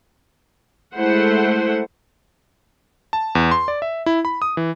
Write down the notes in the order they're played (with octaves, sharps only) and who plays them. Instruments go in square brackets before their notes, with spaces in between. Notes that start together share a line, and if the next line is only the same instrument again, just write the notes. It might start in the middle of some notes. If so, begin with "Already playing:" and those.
[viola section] G#3 A3 E4 C5 F#5
[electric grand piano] A5
E2
C6
D5
E5
E4
B5
D#6
E3